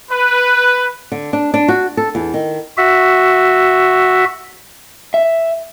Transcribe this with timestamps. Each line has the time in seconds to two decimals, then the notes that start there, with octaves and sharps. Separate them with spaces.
0.11 B4
1.12 D3
1.33 D4
1.54 D4
1.68 F#4
1.97 A4
2.15 E2
2.34 D#3
2.77 F#4 E5
5.14 E5